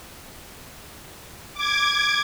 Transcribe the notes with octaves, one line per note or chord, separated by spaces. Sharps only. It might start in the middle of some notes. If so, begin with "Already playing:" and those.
D6 G#6